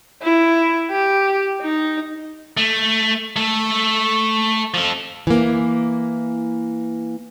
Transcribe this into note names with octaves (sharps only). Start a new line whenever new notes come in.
E4
G4
D#4
A3
A3 A4
F3 A4
E3 A#3